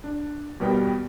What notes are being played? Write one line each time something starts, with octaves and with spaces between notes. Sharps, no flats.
D4
D#2 B2 G3 B3 A#4 G5